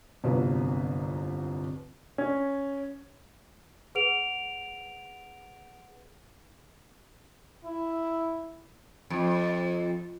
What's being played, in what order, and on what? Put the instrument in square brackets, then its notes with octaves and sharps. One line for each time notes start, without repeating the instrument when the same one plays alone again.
[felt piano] G1 C2 F2 F#3 B4
[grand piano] C#4
[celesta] G#4 B4 F#5 D7 F7
[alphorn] E4
[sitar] F2